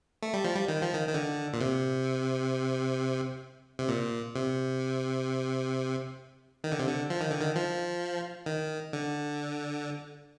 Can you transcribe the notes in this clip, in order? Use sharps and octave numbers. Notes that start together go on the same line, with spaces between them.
A3
G3
F3
G3
D#3
F3
D#3
D#3
D3
A#2
C3
C3
A#2
C3
D#3
D3
C3
D3
F3
D#3
D3
D#3
F3
D#3
D3